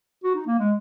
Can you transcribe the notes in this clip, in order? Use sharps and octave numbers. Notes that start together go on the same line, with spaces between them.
F#4
D#4
A#3
G#3